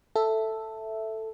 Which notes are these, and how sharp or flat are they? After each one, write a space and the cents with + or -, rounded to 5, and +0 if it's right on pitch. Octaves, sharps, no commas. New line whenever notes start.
A4 +5 E5 +0